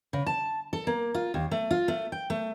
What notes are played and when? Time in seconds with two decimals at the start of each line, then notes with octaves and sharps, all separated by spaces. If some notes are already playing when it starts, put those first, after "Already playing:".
0.13 C#3
0.26 A5
0.73 A4
0.87 A#3
1.14 F4
1.34 D#2
1.51 A3
1.71 F4
1.88 A3
2.12 G5
2.30 A3